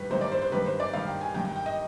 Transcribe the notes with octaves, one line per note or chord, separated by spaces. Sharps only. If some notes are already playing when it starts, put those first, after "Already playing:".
Already playing: G2 D#3 B4
G2 D#3 C5
D5
C5
C5
G2 D#3 B4
C5
D5
G2 D#3 F5
G5
G#5
G2 D#3 G5
G5
G5
D#5